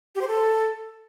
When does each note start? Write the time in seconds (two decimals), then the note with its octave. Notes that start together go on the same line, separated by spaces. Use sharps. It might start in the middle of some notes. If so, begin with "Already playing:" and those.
0.15 G4
0.21 C5
0.28 A4